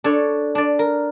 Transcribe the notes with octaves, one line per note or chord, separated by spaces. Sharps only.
D4 A4 C#5
D4 D5
A#4